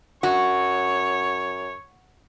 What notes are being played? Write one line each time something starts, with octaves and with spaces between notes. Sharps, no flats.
F#2 F#4 C#5